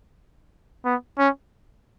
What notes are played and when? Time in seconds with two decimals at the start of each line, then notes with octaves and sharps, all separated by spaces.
0.85 B3
1.19 C#4